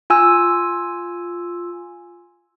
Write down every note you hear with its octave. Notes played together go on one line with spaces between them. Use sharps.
F4 G#5 E6